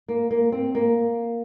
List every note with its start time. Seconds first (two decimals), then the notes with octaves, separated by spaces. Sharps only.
0.08 A#3
0.31 A#3
0.52 C4
0.75 A#3